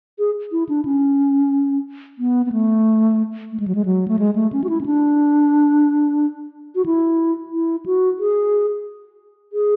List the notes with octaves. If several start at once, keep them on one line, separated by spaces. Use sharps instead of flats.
G#4
E4
D4
C#4
B3
B3
A3
A3
G#3
F#3
G#3
F#3
A3
G#3
A3
C#4
F#4
E4
C#4
D4
F#4
E4
E4
F#4
G#4
G#4